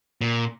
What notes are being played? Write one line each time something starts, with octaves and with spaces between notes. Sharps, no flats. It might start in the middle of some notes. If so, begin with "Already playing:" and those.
A#2